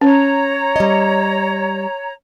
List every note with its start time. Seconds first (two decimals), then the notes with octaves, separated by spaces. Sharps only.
0.01 C#4 C#5 A#5
0.76 G3 D#5